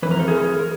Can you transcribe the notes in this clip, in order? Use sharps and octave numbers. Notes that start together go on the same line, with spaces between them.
F2 C#3 E3 B4
A#4
A4
G#4 A#4
A#4